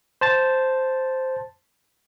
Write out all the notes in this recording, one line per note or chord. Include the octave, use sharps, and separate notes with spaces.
C5 A5 A6